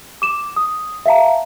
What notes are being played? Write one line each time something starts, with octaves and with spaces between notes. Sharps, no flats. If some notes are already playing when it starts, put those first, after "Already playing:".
D6 E7
D#6
E5 F5 A5 A#5